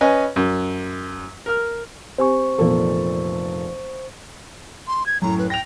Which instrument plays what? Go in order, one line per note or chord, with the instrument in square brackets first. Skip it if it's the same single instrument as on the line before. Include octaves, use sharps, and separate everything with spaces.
[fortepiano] C#4 B4 D#5 G#5
F#2
A#4 F6
[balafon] C4 G4 G#5 [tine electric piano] C5 C#6
[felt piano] F1 A#2 A4 [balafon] E3 B3
[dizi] C6
G#6
[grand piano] F#2 A2 [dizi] A#5
[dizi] B4
[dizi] G5 [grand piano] A#6 F7